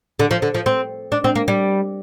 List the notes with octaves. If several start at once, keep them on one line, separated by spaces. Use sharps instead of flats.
D3
F3
D3
F3
C4
D4
C4
A#3
G3